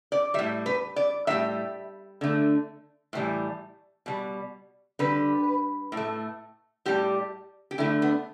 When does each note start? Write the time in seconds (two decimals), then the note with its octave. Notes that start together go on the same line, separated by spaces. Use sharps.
0.12 D5
0.34 A2 G3 E5
0.66 B4
0.96 D5
1.27 A2 G3 E5
2.21 D3 A3
3.13 A2 E3 G3
4.06 B2 G3
4.99 D3 G3 B4
5.92 A2
5.97 A3
6.85 A2 G3 G4
7.71 G4
7.78 D3 A3 E4
8.02 B3